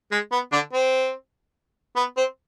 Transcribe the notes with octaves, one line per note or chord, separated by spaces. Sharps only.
G#3
B3
D3 D4
C4
B3
C4